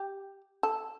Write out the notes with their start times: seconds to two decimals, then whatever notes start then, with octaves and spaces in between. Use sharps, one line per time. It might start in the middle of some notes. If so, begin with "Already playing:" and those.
Already playing: G4
0.63 A4